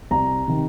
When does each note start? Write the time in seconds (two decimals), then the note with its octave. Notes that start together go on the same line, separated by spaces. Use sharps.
0.11 C2 A#5
0.48 C3 D#3